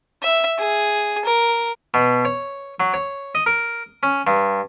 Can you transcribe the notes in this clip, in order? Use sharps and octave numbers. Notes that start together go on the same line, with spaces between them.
E5
G#4
A#4
B2
C#5
F#3
C#5
D#5
A#4
C#4
G2